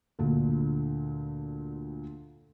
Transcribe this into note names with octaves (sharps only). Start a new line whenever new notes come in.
D2 A#2 D3